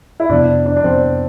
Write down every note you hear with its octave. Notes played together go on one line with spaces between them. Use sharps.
E4
F2 C3 F3 B3 D4
D4
D4
F2 C3 F3 B3 C4